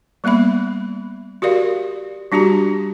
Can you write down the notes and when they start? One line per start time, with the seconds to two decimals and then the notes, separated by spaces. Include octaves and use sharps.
0.24 G3 A#3 B3 E5 B5
1.42 F#4 G4 A#4 D5 F5
2.32 G3 D4 F#4 G4 A#5